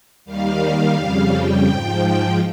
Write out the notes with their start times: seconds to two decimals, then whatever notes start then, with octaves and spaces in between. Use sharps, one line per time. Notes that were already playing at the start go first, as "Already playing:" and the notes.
0.25 D#2 D#3 G3 F5
0.96 F2 C#3 G3
1.32 G5
1.68 G#2 F3